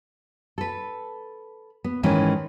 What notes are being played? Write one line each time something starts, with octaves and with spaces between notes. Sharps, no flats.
A4 B4
B3
G#2 D#3 E3 G#3 C#4